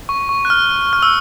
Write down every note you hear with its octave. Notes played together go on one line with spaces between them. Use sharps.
C#6
C#6
F#6
F6
F6
E6